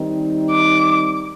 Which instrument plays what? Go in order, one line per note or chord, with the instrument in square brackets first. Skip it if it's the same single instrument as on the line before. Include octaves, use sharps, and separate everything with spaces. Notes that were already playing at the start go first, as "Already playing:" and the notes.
Already playing: [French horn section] D#3 G3 C4 D#4
[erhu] D6